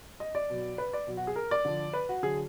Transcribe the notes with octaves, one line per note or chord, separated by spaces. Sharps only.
D#5
D5
B2 F#3
B4
D5
B2 F#3
F#4
G#4
A#4
D5
D3 F3
B4
F#4
D3 F#3 G#4